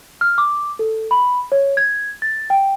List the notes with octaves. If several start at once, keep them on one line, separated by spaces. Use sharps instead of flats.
F6
D6
A4
B5
C#5
G#6
A6
G5